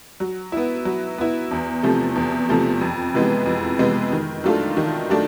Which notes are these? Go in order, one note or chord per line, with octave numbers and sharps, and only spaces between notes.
F#3
B3 E4
F#3
B3 E4
E2
C3 F3 A3
E2
C3 F3 A3
F2
C3 E3 G#3 B3
F2
C3 E3 G#3 B3
D#3
F#3 A3 D4 F4
D#3
F#3 A3 D4